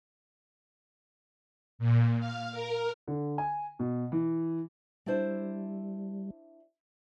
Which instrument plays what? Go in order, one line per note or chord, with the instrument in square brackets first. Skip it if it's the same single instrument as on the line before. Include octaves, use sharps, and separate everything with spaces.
[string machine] A#2
F5
A#4
[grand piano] D3
G#5
B2
E3
[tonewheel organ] G3 [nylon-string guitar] D4 E4 C5